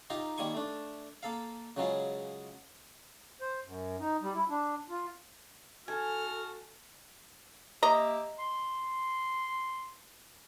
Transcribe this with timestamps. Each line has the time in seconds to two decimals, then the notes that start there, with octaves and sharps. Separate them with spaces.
0.10 D#4 F4 G4 A#5
0.38 D#3 G3 A#3 G#5 C#6
0.54 A3 D4
1.23 A#3 A4 F5
1.76 C#3 F#3 G#3 F4
3.41 C5
3.65 F#2
4.00 D#4
4.22 G3
4.34 E4
4.49 D4
4.89 F4
5.88 F#4 A4 G#5 F6
7.83 A#3 G4 D#5 E5 A#5
8.39 C6